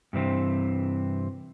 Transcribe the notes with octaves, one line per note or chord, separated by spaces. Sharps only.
G2 C3 E3 C4